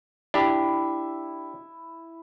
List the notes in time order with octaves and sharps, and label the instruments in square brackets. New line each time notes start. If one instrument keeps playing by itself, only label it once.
[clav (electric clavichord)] D4 G4 [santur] E4